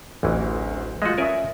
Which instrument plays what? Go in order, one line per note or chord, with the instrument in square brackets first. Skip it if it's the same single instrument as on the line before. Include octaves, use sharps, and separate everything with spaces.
[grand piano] D1 D2 [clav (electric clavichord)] A1 E3
[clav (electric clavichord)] G#3 A3 F#4 [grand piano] F4 D#5
[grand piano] C#4 E5 D#6 [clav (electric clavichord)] A#4 D5 G#5